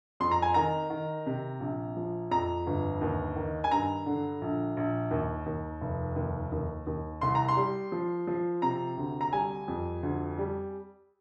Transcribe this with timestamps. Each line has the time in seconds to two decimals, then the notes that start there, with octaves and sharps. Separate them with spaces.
0.20 F2 C6
0.31 A#5
0.42 G#5
0.54 D#3 A#5
0.90 D#3
1.26 C3
1.60 A#1
1.96 F3
2.31 F2 A#5
2.67 G1
3.01 D#2
3.36 D#3
3.64 G#5
3.71 G2 A#5
4.06 D3
4.41 A#1
4.77 A#1
5.11 D#2
5.46 D#2
5.81 F1
6.16 D#2
6.52 D#2
6.87 D#2
7.21 C2 C6
7.35 A#5
7.48 C6
7.57 G3
7.92 F3
8.27 F3
8.62 C3 A#5
8.97 D2
9.21 A#5
9.32 G3 G#5
9.68 F2
10.03 D2
10.38 G3